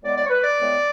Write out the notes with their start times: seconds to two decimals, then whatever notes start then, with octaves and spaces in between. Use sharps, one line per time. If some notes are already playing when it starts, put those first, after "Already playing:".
0.03 A2 G#3 B3 D5
0.17 D5
0.26 C#5
0.30 B4
0.44 D5
0.58 A2 G#3 B3